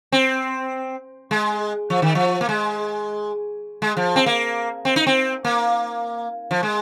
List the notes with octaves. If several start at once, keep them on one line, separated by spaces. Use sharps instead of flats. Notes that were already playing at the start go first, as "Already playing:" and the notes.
C4
G#3
F3
D#3
F3
A#3
G#3
G#3
F3
C4
A#3
C4
D#4
C4
A#3
F3
G#3